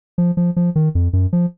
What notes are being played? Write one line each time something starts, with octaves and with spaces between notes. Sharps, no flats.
F3
F3
F3
D#3
F2
F#2
F3